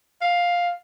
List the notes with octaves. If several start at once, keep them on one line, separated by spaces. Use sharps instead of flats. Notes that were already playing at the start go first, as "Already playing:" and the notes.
F5